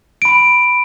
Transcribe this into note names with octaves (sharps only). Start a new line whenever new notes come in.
B5 D7